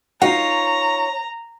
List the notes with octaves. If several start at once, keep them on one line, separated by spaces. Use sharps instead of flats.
D#4 F4 F#4 C#5 F#5 A#5